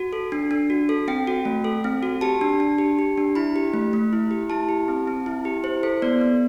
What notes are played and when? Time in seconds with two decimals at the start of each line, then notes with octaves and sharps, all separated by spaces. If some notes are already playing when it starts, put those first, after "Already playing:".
Already playing: F#4
0.13 A4
0.32 D4
0.51 D4
0.70 F#4
0.89 A4
1.08 C4 G5
1.27 F#4
1.45 A3
1.64 A4
1.84 C4
2.03 F#4
2.21 G4 A5
2.41 D4
2.60 D4
2.78 G4
2.99 G4
3.17 D4
3.35 E4 B5
3.56 G4
3.74 A3
3.93 A3
4.13 E4
4.31 G4
4.50 E4 A5
4.69 G4
4.88 C4
5.07 C4
5.26 E4
5.45 G4
5.64 E4 C5
5.83 A4 C5
6.02 B3 D5
6.21 B3